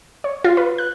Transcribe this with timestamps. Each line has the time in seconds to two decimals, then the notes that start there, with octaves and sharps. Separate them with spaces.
0.24 C#5
0.44 F4
0.57 B4
0.78 F#6